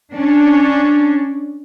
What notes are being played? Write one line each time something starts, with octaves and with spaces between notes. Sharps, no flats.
C#4 D4